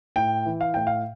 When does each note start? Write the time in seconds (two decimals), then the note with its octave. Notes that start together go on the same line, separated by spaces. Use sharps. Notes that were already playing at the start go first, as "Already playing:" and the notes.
0.16 A2 G5
0.45 E3
0.61 F5
0.74 A2 G5
0.87 F5